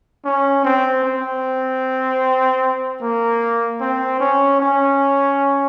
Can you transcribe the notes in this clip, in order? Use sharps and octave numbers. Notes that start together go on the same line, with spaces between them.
C#4
C4
C4
A#3
C4
C#4
C#4